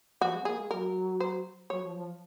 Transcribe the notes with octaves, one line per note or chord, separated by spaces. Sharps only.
F3 F#4
G#3
C4
A#3 G#4
G#3
F#3 A#4
C5
F#3 C#5
F3
F3